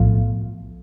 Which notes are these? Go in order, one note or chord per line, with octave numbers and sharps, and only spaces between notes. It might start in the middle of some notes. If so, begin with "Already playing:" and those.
Already playing: B1 A2 F3